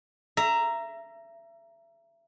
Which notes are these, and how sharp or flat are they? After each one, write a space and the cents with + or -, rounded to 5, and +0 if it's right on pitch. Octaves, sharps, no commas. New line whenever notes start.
E5 +30 A#5 +0